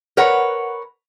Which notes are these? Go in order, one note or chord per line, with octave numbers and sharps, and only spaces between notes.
A#4 B4 C#5 F#5